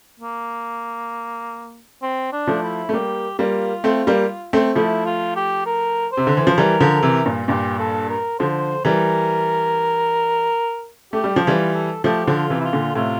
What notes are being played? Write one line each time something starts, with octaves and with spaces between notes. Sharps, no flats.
A#3
C4
D4
F3 A3
E4
A3
G3 A#3 G4
G3 A#3 F4
A3 C4
G3 A#3
A3 C4
F3 A3 E4
F4
G4
A#4
C5
C3
D3
E3
F3
E3 G3 A#4
D3 F3
C3 E3
G2 A#2
G2 A#2 G4
A4
A#4
D3 F3 C5
E3 G3 A#4
A3 G4
G3
F3
E3 G3 F4
A4
F3 A3 G4
D3 F3
F4
C3 E3
E4
F4
A#2 D3
A2 C3 F4